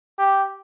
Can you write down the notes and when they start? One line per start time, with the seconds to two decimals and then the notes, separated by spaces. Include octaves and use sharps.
0.19 G4